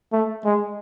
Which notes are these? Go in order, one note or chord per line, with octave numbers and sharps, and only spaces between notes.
A3
G#3